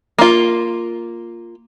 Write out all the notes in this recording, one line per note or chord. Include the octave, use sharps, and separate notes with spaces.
A#3 F4